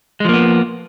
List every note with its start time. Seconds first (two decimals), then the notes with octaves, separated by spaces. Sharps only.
0.20 G#3
0.25 F3
0.29 A#3
0.33 B3